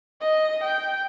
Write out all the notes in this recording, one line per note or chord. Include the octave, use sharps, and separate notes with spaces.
D#5
G5